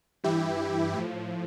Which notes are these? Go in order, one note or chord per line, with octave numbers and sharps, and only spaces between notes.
G2 E3 E4 G4
A2 F3